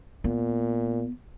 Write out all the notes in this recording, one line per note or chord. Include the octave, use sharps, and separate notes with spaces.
A#2 B3